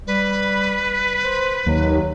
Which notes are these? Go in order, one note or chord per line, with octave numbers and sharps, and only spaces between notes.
G3 B4
C5
D#2 F#3